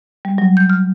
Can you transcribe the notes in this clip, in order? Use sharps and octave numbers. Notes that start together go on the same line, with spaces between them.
G3
F#3
G6
F6